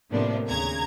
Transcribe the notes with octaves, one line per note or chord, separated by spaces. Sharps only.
A2 C3 F3 A#3 B3 D4
D#2 C#3 A#5 G#6